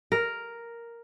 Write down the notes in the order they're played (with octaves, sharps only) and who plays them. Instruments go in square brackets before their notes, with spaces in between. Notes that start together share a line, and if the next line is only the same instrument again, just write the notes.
[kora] A#4